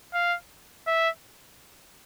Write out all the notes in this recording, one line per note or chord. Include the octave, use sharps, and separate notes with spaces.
F5
E5